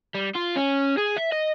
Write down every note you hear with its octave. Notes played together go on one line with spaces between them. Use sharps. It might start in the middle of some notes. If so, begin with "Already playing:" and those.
G3
F4
C#4
G#4
E5
D#5